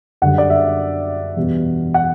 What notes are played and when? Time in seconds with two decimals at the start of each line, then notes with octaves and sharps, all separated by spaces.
0.22 F#2 D3 G3 F#5
0.38 D5
0.50 E5
1.37 E2 B2 G3
1.94 F#5